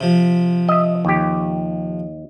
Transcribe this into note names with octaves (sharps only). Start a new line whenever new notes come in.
C3 F3
D#5 E5
D#2 G4